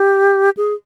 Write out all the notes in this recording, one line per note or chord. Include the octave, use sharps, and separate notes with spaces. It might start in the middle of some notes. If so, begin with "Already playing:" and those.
Already playing: G4
G#4